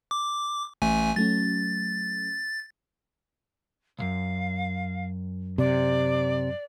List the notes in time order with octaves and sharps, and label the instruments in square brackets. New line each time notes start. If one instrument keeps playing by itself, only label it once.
[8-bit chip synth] D6
A1 A3 G#5
[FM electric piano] F#3 A3 C#4 [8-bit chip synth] A6
[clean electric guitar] C2 F#2 [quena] F5
[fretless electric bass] C3 [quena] D5